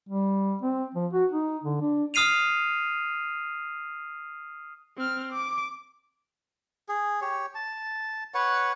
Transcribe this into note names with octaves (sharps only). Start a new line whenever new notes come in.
G3
C4
F3
F#4
D#4
D3
D4
D#6 F6 C7 D#7 F7
C4 F6
D6
G#4
G4 C#5
A5
B4 C#5 F#5